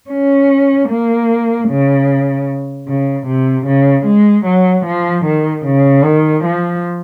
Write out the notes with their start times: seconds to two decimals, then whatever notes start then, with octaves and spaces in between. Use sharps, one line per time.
0.11 C#4
0.89 A#3
1.69 C#3
2.88 C#3
3.27 C3
3.66 C#3
4.06 G#3
4.46 F#3
4.86 F3
5.26 D#3
5.66 C#3
6.05 D#3
6.45 F3